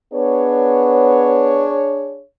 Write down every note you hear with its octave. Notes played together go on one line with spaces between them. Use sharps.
B3 D4 G#4 C#5